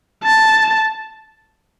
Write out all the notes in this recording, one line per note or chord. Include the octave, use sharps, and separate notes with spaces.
A5